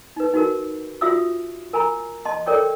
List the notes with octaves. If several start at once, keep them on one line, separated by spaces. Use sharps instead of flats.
D#4 B4
D#4 F#4 A#4
F4 F#4 E5 D#6 E6
A#4 G#5 A#5 B5
D#5 A5 C6
A4 A#4 C#5 D5 G5 C#6